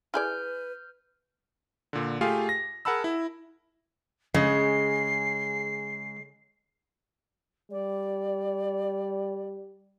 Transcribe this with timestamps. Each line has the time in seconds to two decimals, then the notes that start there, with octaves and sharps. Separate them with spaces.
0.14 E4 G#4 B4 D5 F6 G6
1.93 A#2 D3
2.21 A3 F4 G4 G#4 F5 G#5
2.49 A#6
2.85 G#4 A#4 F#5 A5 B5 E6
3.04 E4
4.34 C#3 G#3 C7
7.72 G3 D5